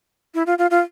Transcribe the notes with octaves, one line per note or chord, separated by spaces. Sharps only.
E4
F4
F4
F4